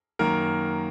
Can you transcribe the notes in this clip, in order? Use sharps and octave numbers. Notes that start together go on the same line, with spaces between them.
F#2 D#3 A#3 A#4